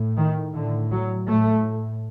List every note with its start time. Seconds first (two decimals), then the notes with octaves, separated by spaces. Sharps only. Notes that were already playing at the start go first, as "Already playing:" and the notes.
Already playing: A2
0.17 D#3
0.54 A2 D3
0.91 F#3
1.28 A2 A3